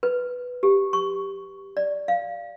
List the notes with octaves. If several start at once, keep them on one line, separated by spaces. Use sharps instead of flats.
B4
G4
C#6
D5
F5